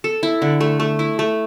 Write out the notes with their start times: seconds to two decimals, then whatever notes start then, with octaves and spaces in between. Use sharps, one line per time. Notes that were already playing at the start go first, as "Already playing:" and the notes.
0.04 A4
0.23 E4
0.42 D3
0.61 A3
0.80 A3
0.99 E4
1.19 A3